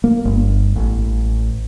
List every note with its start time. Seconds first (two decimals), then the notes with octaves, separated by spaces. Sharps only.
0.04 A#3
0.25 G1
0.76 A1